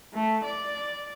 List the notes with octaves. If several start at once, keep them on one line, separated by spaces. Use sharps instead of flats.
A3
D5